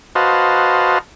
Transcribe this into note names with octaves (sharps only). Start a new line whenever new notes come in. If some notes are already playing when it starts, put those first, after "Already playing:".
F#4 B4 C5 D#5 F5 A5